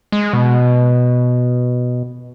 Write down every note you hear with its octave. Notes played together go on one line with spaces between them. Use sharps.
G#3
B2